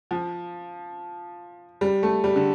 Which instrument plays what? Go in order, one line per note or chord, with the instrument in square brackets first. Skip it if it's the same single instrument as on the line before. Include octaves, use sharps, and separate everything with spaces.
[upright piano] F3
G3
A3
G3
D3